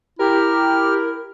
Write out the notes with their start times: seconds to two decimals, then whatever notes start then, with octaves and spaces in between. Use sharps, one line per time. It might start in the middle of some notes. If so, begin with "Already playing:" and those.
0.19 E4 G4 A#4 F6